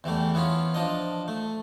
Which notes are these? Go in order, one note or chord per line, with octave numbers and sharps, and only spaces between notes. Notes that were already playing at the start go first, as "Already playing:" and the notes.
E2 E3 G3 A3
E3 B3 C#4 F4
F3 D4 D#5
A3